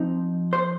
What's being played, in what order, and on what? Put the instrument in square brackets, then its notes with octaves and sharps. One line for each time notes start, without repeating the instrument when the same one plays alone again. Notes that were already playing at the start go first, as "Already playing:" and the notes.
Already playing: [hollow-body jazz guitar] F3 C4 D#4
C5